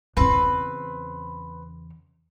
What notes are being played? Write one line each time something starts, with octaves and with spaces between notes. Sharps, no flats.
E2 C#3 C4 B4